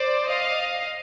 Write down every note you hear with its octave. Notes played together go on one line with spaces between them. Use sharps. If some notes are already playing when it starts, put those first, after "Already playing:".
Already playing: C5 D5
D#5 F5